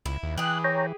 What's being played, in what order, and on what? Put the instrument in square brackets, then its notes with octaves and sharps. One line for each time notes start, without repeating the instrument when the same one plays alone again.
[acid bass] C#2 [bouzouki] E4
[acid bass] D#2
[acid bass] E3 [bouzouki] G4 G#4 [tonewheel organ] F#6
[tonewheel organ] C#5 G5 A#5